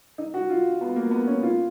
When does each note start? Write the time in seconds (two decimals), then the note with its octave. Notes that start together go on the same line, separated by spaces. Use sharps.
0.18 D#4
0.34 F#4
0.50 F4
0.81 B3
0.96 A#3
1.11 B3
1.27 C#4
1.43 F4